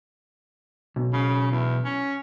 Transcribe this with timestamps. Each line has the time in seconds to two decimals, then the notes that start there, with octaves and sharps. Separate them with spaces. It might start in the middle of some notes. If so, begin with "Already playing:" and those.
0.96 B1
1.13 C#3
1.51 E2
1.85 C#4